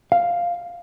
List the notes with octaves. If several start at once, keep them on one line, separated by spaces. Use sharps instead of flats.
F5